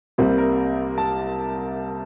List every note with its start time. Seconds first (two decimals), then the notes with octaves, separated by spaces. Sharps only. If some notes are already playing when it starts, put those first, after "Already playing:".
0.18 C2 C3 G3 A#3 C5
0.38 A#4
0.98 A5